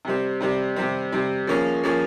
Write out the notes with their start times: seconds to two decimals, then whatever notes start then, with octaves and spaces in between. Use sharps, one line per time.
0.05 C3 G3 C4
0.41 C3 G3 C4
0.76 C3 G3 C4
1.12 C3 G3 C4
1.47 F3 A#3 C#4 G#4
1.84 F3 A#3 C#4 G#4